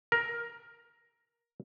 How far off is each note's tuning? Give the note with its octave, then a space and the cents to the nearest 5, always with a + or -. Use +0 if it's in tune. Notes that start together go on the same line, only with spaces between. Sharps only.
A#4 +10